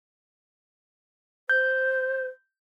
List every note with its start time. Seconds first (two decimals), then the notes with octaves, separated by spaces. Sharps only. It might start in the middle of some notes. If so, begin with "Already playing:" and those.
1.49 C5 G6